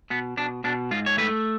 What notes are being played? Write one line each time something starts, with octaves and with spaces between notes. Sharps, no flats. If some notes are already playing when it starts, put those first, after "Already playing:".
B2 B3
B2 D4
B2 D4
G#2 F4
C#5
A3 B4